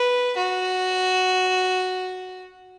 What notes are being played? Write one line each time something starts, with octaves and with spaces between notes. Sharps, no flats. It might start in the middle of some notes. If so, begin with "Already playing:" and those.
Already playing: B4
F#4